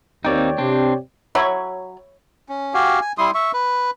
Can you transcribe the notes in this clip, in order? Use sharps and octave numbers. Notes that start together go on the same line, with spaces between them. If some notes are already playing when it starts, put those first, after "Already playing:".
D#2 A#3 C4 D#4 C#5 D5 G5
C3 C4 D4
F#3 C#5 E5 B5
C#4
F#4 G4 F5 G#5
G#5
G3 E4 C6 D#6
E5 C#6
B4